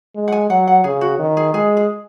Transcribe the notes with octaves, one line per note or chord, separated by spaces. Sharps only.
G#3
F#5
G#5
F#3 F#5
F#5
C#3 G#4
F#4
D#3
G#4
G#3 G#4
G#4